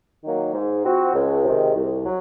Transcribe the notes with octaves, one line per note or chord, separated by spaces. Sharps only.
D#3 F#3 A#3
G#2
F3 C4 F#4
C#2
C3 D#3 G#3
C2
F#3